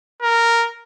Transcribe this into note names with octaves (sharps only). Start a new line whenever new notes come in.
A#4